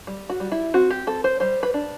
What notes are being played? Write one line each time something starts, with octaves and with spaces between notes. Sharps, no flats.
G3
F#4
G3
E4
C4 F#4
G4
C4 A4
C5
G3 C5
B4
D4